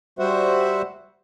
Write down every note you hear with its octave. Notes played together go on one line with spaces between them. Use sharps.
G3 F#4 C5 E5 F#5